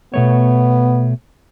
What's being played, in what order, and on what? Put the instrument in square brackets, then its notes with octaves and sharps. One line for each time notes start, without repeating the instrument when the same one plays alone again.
[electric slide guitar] B2 A3 C#5 [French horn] B3